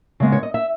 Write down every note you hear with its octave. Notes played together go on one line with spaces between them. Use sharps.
C#3 G#3 B3
C#5
D#5
E5